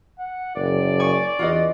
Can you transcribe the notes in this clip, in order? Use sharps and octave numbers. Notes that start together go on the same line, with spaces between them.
F#5
F#1 D5
G#5 C#6 D6
E2 F4 F#4 D#5